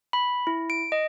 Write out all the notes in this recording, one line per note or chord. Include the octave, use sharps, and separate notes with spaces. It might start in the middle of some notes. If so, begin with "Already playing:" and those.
B5
E4
D7
D#5